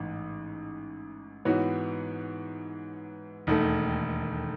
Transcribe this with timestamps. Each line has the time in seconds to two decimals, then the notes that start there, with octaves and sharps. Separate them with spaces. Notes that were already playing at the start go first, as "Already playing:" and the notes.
Already playing: A1 G#2 E3
1.45 G#2 E3 B3 F#4 C#5
3.47 E1 D#2 D#3 A3